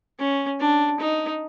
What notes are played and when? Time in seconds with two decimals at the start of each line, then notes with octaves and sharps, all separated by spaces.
0.19 C#4
0.60 D4
1.00 D#4